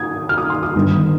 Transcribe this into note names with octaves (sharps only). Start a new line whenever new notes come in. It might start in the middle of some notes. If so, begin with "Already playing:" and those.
Already playing: D#6 G#6
F6
D#6
C6
D#6
G1 G2 D#3